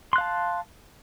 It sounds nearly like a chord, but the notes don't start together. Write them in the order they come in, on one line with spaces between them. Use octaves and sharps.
C6 F#6 F5 A5